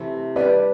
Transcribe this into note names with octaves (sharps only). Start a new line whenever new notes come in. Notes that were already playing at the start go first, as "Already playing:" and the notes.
Already playing: C3 E3 A3 C4
G3 D4 G4 B4 D5